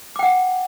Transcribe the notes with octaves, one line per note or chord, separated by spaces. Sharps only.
F#5 G5 D6